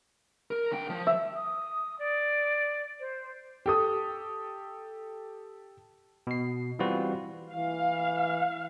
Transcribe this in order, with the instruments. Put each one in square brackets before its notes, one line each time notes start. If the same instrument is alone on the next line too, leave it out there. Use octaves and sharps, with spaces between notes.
[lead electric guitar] A#4
D3 G5
F3
[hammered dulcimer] E5
[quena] D#6
D5
C5
[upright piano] G4 A4 D#6
[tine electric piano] B2 C7
E3 G3 C4 F4 F#4 B4
[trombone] E3 [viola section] F5